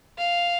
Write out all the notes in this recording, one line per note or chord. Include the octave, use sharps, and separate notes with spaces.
F5